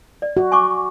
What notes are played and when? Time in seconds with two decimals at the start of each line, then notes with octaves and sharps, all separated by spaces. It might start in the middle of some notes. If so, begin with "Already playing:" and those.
0.22 D5
0.37 F#4
0.52 G#5 C#6 D6